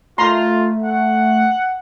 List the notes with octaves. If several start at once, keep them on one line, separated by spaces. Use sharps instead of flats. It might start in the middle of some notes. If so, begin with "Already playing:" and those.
A3 F4 A#5 C6
F#5